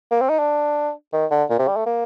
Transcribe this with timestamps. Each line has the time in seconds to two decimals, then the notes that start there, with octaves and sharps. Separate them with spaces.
0.11 A#3
0.21 C4
0.29 D#4
0.39 D4
1.13 D#3
1.31 D3
1.50 A#2
1.59 C3
1.68 G3
1.76 A3
1.86 A#3